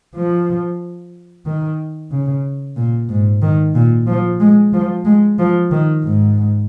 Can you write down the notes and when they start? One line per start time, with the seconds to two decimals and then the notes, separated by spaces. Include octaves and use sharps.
0.15 F3
1.46 D#3
2.11 C#3
2.76 A#2
3.09 G#2
3.42 D#3
3.75 A#2
4.07 F3
4.39 G#3
4.73 F3
5.05 G#3
5.39 F3
5.71 D#3
6.03 G#2